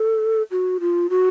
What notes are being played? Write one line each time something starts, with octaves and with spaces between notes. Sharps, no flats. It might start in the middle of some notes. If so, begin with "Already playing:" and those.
Already playing: A4
F#4
F4
F#4